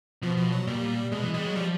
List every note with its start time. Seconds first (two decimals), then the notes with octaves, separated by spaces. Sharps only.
0.22 B2 F3
0.37 F3
0.52 F#3
0.67 A#2 G3
1.12 B2 G#3
1.23 E3
1.34 G3 G#3
1.46 F#3
1.56 F3 G3